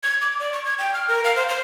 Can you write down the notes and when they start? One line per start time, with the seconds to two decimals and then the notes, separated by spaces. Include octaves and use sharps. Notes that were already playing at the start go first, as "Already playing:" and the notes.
0.03 G#6
0.21 D6
0.40 D5
0.53 C#6
0.65 G#6
0.79 G5
0.94 F6
1.09 A#4
1.24 F5
1.36 C5
1.49 C5